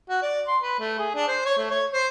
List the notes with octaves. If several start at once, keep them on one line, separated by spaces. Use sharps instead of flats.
F#4
D5
C6
B4
A3
G#4
D4
C5
C#5
A3
C#5
C5